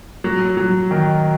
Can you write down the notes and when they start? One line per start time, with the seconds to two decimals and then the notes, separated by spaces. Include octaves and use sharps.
0.24 F#3
0.57 F#3
0.91 D#3